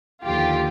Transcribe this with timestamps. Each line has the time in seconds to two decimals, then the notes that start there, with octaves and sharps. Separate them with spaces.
0.24 D#2 D3 F3 F4 G4